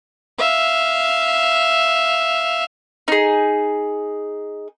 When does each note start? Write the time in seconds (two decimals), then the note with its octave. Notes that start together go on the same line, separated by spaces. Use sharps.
0.38 E5 F5
3.08 D#4 G#4